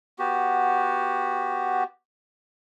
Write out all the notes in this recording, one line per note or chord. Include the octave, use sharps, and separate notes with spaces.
B3 F#4 G4